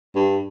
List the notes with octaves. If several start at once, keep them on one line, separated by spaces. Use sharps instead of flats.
G2